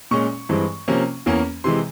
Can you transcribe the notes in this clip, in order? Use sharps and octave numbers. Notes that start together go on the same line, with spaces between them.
A#2 G#3 C#4 C#6
G2 E3 G#3 C4
C3 F3 A#3 C#4
E2 E3 A#3 C#4
C3 E3 G#3 C6